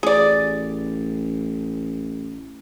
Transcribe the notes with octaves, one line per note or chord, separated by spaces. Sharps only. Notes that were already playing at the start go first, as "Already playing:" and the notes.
A1 G#4 D5